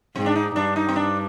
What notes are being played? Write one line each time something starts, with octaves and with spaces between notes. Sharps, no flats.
G#2 C4
D4
D#4
G2 D4
D#4
C4
D4